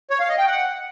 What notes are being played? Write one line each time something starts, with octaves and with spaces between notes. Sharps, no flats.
C#5
F5
D#5
G5
F#5